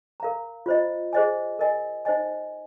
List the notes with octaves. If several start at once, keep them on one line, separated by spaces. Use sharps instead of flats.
A#4 F5 A#5
F4 C5 D#5
G#4 C5 D#5 G#5
A#4 D#5 G#5
D#4 C5 D#5 G#5